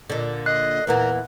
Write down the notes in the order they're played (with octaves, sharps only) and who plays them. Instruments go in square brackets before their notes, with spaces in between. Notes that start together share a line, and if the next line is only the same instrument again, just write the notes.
[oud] A#2 D3
[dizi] D#5 [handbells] F#6 [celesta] C7
[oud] E2 A#2 E3 [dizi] A#4 [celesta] B4 F#5